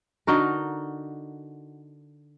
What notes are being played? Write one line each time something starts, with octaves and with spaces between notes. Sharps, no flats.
D3 D#4 F#4 A#4